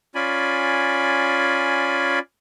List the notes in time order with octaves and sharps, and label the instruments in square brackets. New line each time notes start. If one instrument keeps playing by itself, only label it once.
[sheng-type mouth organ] C#4 F4 D5 G#5 B5